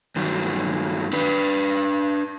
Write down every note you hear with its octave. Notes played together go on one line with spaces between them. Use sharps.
G2 D#3 F#3
D4 B4